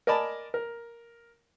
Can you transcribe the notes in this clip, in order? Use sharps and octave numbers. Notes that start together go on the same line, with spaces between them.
A#4 D5 D#5 G#5 A5 B5
A#4